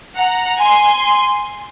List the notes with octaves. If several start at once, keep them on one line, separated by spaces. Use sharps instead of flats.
F#5 A#5
G#5 C6